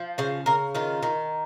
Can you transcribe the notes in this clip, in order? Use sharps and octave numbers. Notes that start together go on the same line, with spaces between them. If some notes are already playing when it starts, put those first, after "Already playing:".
Already playing: F3
C#3 C5
C#3 A#4
D#3 F4
D#3